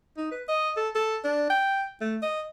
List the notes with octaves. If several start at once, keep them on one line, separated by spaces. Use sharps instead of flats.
D#4
B4
D#5
A4
A4
D4
G5
A3
D#5